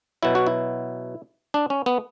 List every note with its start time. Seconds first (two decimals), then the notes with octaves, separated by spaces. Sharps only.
0.23 B2 F#3 E4
0.35 F#4
0.47 E4
1.54 D4
1.70 C#4
1.86 B3